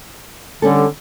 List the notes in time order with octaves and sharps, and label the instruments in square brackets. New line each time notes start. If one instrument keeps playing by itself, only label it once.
[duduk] D3 [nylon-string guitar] G3 C#4 A4